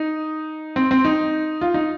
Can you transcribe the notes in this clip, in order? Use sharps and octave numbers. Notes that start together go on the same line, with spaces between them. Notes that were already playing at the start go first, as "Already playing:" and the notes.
Already playing: D#4
C4
C4
D#4
F4
D#4